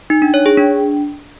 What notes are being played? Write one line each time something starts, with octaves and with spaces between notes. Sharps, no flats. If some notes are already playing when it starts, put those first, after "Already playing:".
D#4
D4
C#5
G#4
D4